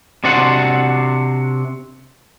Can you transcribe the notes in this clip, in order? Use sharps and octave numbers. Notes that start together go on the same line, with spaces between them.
C3 D4 F#4 C5 F#5